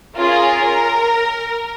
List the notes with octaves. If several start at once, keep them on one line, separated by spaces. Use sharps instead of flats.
C#4 F4 G#4 A#4